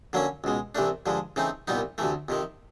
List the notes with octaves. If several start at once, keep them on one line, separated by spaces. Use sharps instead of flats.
D3 F#3 A#3 C#4
C#2 B2 G#3
C2 C3 E3 A3 D4
G2 D3 F3 G#3
C#3 E3 A3 C4 D#4
C2 A#2 G3 B3 D#4
D2 C3 E3 A3
F2 C3 D#3